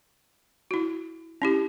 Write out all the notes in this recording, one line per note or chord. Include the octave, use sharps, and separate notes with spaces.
E4 F#4
C#4 E4 G4